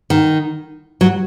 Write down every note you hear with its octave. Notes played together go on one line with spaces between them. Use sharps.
D#3
F#3